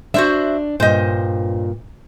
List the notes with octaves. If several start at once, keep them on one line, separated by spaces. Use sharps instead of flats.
D4 F#4 C5 E5
G2 A#2 C5 D#5